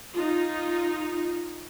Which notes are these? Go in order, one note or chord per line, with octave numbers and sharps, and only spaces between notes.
D#4 F4